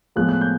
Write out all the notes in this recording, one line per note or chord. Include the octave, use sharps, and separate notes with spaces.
A2 F3 G#3 B3 F#6
F#6
G6